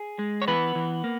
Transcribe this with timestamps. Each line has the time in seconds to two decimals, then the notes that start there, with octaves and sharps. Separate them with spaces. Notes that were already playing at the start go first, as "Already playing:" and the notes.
Already playing: G#4
0.19 G#3
0.42 C#5
0.48 E3 B3 B4
0.75 E3
1.04 A#3